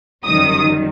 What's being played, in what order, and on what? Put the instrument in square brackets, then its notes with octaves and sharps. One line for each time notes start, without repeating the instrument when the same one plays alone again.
[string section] G1 F#2 D#3 G3 D#6